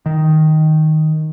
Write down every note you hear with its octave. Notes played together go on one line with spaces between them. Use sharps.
D#3